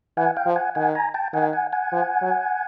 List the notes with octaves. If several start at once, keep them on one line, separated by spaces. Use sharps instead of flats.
E3 F#5 G#5
F5 G5
F3
F#5 G#5
D#3 F#5 G#5
G#5 A#5
G5 A5
D#3 F#5 G#5
F#5 G#5
F#5 G#5
F3
F#3